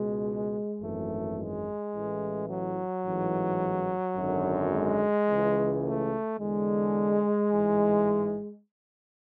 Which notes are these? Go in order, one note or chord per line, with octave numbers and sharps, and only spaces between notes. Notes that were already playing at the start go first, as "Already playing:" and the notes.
Already playing: C#2 B2 G#3
G#1 F#2 E3 A3
G#3
A1 A2 E3
F#3
A1 G#2 E3
G#1 F#2 D3
G#3
C#2 C#3 E3
A3
E2 D3 G#3
A1 G#2 E3